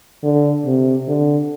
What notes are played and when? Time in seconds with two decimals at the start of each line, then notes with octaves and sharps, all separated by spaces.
0.23 D3
0.65 C3
1.08 D3